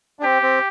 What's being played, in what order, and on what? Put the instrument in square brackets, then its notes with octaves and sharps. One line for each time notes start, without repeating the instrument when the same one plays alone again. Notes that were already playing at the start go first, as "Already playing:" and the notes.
[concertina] D4
[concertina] C4 [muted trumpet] G4
[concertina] C4